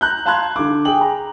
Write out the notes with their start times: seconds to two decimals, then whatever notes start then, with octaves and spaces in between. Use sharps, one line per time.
0.01 A#5 F#6 G6
0.26 F5 A5 B5 C6 F#6 G#6
0.56 D3 D6
0.85 G#4 G5 F#7
1.01 A#5